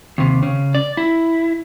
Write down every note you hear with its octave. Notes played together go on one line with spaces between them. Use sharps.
D#2 C3
C#3
D5
E4